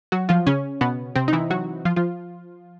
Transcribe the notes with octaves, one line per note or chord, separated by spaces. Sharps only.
F#3 F#4
F3 F4
C#3 C#4
B2 B3
C3 C4
D#4
E3 E4
F#3 F#4
F3 F4
F3 F4